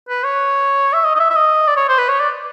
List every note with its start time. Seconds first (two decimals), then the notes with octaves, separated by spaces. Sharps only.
0.09 B4
0.24 C#5
0.93 E5
1.04 D#5
1.15 D#5
1.20 E5
1.30 E5
1.36 D#5
1.67 D5
1.77 C#5
1.88 C5
1.98 B4
2.09 C#5
2.20 D5